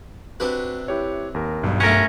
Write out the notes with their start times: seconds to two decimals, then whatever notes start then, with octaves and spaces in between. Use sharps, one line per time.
0.40 C3 D4 F#4 B4
0.88 E4 G4 C#5
1.34 D#2 A#4
1.63 B1 G2
1.80 A3 C#4 A#4 F#5